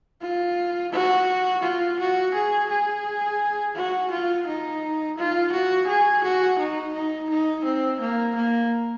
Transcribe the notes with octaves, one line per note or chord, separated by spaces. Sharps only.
F4
F#4
F4
F#4
G#4
G#4
F#4
F4
D#4
F4
F#4
G#4
F#4
D#4
D#4
D#4
C4
A#3
A#3